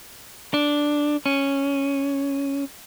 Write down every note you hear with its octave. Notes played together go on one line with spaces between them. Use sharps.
D4
C#4